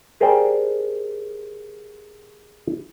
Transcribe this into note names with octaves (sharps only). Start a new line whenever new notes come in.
G4 G#4 A#4 C5 D5 G5